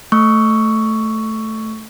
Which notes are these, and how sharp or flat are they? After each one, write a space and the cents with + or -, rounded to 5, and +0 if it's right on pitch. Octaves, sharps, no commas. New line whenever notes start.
A3 +0 C#6 +10 E6 +15